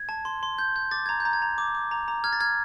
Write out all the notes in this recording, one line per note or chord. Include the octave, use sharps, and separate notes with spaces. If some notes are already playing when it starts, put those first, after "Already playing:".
Already playing: G#6
A5
C6
C6
G6
G6
D6 A6
A#5 G#6
G6
A#5
G#6
A#5
D6
D6
A#5
A#5
F6 G#6
A6
F6 G#6